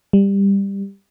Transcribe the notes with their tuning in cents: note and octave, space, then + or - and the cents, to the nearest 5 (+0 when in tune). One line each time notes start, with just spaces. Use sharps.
G3 +15